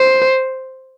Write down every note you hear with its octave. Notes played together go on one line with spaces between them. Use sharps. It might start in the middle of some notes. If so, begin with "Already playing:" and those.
Already playing: C5